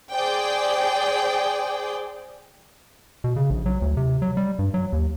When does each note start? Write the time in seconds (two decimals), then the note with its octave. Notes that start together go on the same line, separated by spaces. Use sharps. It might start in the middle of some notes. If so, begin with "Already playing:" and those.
0.12 G#4 C5 D5 G5
3.24 B2
3.36 C#3
3.50 A#1
3.66 F#3
3.82 D2
3.97 C3
4.22 F#3
4.37 G3
4.59 G2
4.74 F#3
4.93 D#2